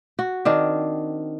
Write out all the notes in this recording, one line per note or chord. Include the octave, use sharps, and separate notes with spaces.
F#4
D#3 C4 D4